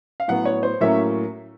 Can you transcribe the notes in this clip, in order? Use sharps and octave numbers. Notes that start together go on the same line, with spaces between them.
F5
A2 F#3 B3 F#5
C#5
C5
A2 F#3 A#3 C#4 E5